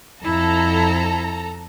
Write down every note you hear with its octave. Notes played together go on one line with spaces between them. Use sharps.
F2 E4 A4 A#5